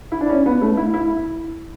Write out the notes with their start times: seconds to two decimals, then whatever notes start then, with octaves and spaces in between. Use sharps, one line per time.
0.12 E4
0.21 D4
0.30 C#4
0.46 B3
0.62 A3
0.77 E4
0.94 E4